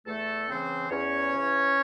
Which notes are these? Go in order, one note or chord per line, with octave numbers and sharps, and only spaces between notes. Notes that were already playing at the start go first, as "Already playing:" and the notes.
E2 A3 A4
C#3 E3 C4 C5
E2 C#4 C#5
C#3 E3